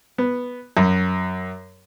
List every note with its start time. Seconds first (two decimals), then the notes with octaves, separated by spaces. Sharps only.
0.18 B3
0.77 F#2